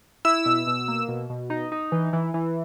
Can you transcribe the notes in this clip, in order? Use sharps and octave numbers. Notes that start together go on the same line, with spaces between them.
E4 E6
B2
B2
A#3
B2
B2
D#4
D#4
E3
E3
E3